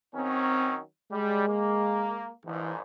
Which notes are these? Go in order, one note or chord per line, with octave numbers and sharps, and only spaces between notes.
D#3 F#3 C4 C#4
G3 G#3
A#3
A#1 G#2 E3